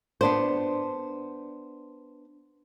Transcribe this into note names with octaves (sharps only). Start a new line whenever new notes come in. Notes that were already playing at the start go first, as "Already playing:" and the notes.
B3 D4 C5